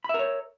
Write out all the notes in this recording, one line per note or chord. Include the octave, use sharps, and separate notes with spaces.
A#4 C#5 E5 B5